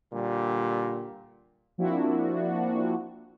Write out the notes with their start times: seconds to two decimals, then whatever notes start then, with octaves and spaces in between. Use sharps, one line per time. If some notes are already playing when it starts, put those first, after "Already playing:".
0.12 A#2 D3 G3
1.78 F3 A#3 C4 D4 E4 F#4